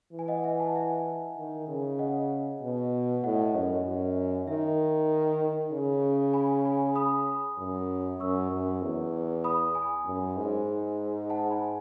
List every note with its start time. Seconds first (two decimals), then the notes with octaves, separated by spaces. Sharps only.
0.13 E3
0.19 G#5
0.28 D#5 F#5
0.44 E5 G#5
0.60 F#5 A5
0.75 E5 G#5
1.37 D#3
1.68 C#3
1.99 D#5 F#5
2.61 B2
3.23 A2 D#5 F#5
3.54 F#2 D#5
3.86 F#2
4.48 D#3 E5
5.72 C#3
6.33 G#5 B5
6.65 G#5 B5
6.96 B5 D#6
7.58 F#2
8.20 F#2 C#6 E6
8.51 F#2
8.82 E2
9.44 B5 D#6
9.75 G#5 B5
10.06 F#2
10.37 G#2
11.30 F#5 A5
11.51 G#5 B5